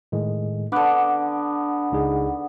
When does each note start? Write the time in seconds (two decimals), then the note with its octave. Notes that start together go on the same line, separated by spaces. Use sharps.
0.12 A2 D#3 G#3
0.72 D3 B3 D4 D6 F#6
1.92 C#2 D#4 G#4